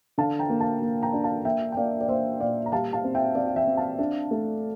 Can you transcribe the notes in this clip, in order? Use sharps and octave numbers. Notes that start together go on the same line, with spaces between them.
D3 F5 A5
G5 A#5
A#3
F5 A5
A#3
G5 A#5
D4
F5 A5
A#3 E5 G5
G5
A#3 D5 F5
D5
A#3 C5 E5
A#2 D5 F5
A#5
G3 F5 A5
F5 A5
C4
E5 G5
C4 D5 F5
F5
E5 G5
C4
F5 A5
D4
A3